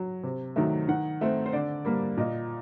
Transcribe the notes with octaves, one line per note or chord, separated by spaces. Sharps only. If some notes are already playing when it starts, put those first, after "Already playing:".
Already playing: F#3
C3
D#3 F#3 A3
D#3 F#5
A3 C4
C5
D3 D5
G3 A#3
A#2 D#5